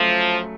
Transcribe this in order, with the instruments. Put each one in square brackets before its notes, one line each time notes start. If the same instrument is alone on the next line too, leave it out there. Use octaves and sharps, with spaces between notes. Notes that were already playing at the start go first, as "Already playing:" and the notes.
Already playing: [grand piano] C#3 F#3 A3 [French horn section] F3